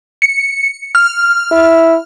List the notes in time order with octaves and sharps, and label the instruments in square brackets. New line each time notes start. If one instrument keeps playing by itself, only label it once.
[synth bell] C#7
F6
[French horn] E4